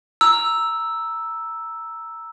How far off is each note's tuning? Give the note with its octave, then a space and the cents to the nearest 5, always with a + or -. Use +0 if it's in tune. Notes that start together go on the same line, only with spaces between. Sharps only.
A#5 +0 E6 +0